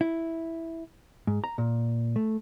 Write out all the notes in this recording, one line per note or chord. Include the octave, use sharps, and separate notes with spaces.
E4
G#2
A#5
A#2
A3